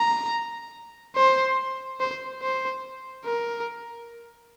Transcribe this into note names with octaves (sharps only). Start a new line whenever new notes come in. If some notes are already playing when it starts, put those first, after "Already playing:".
Already playing: A#5
C5
C5
C5
A#4